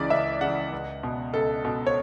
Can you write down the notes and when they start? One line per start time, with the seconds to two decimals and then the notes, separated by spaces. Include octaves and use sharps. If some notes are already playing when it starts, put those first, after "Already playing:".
Already playing: C#2 C#3 E3 D5
0.10 C#2 E5
0.41 C#3 E3 F#5
0.72 C#2
1.03 B2
1.33 C#2 A4
1.65 B2
1.87 C#5